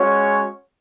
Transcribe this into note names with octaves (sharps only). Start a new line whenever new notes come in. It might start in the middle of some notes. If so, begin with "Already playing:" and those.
Already playing: G#3 C#4 F#4 C#5